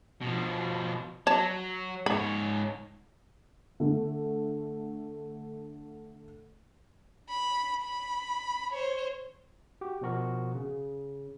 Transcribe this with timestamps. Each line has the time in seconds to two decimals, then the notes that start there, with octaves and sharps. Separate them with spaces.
0.21 B2 F3
1.27 F#3 C#5 A5
2.06 G#2 C#5 B5
3.80 D3 A3
7.29 B5
7.82 B5
8.73 C5 C#5
9.81 F#4 G4
10.01 B2 F3 F#4 A#4
10.55 C#3